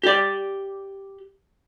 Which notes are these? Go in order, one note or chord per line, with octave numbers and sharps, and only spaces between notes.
G4 D5